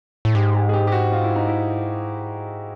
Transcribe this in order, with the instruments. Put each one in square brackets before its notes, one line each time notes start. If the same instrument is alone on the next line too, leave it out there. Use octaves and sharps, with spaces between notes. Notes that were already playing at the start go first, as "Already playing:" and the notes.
[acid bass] A2
[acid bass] G#2 [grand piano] G4
[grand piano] G4
G#4
G4
G4
F#4
F4
E4
D#4
E4